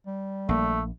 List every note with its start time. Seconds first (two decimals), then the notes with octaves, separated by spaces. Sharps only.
0.07 G3
0.49 A#1 A3 A#3